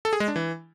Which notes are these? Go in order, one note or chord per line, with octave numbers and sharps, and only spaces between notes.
A4
G#4
G#3
D4
E3